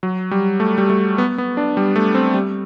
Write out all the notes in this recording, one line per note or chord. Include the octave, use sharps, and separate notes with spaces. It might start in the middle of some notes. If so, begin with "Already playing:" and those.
F#3
G3
A3
G3
A3
B3
B3
D4
G3
A3
C4
G3